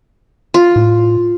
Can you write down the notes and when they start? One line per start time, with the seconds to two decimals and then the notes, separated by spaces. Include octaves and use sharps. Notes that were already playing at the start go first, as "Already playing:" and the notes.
0.54 F4
0.76 A2